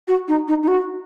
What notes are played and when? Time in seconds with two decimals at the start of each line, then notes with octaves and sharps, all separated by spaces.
0.08 F#4
0.28 D#4
0.48 D#4
0.63 D#4
0.68 F#4